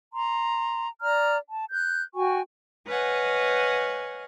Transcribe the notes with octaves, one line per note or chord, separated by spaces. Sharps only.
A#5 C6
D5 A#5 F6
A5
F#6 G6
F#4 G5 G#5 C#6
B4 C#5 D#5 F5 F#5 G#5